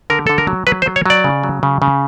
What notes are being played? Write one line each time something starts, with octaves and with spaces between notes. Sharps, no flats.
D3 A#4
D3 A4
A#4
F#3
F#3 B4
C5
F#3
C#5
F#3 D5
C#3
F#3
C#3
C#3